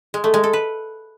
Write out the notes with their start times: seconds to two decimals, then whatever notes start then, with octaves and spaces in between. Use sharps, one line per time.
0.14 G#3
0.24 A3
0.34 G#3
0.44 A4
0.53 B4